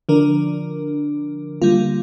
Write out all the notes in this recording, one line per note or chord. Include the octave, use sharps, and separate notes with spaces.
D3 F3 D4 A#4
D3 G3 A#3 F4